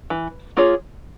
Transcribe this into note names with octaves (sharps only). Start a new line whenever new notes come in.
E3
A#3 F4 G#4 C#5